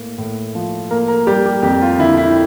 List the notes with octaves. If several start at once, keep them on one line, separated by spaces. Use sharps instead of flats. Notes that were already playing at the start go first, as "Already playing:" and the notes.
Already playing: A2 A#3
A2
F3
A#3 A#4
A#4
G3 G4
G4
F2 G4
F4
D3 E4
E4